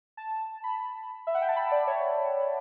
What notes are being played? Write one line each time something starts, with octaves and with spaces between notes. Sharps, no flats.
A5
B5
E5
F#5
G5
A5
B5
D5
C#5